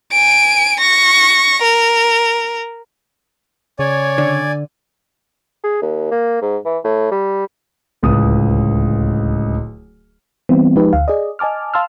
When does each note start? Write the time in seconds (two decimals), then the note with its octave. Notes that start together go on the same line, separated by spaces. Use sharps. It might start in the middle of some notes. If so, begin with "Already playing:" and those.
0.12 G#5 D7
0.80 C#6 A#6
1.62 A#4
3.79 C#3 C#5 D5 G#5
4.18 D3
5.64 G#4
5.82 D#2
6.11 A#3
6.42 G#2
6.65 E3
6.84 A2
7.11 G3
8.02 D1 C#2 D#6
10.49 E3 G3 B3 C4
10.76 F3 G#3 D#4 G4 B4
10.93 D2 F5
11.08 G#4 D5 D#5
11.39 D#5 G#5 A5 D6 F6
11.74 F5 A5 C6 E6 F6